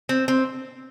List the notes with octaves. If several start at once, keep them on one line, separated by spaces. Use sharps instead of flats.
C4
C4